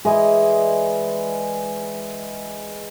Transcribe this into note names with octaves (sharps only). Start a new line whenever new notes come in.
E3 G#3 D5 D#5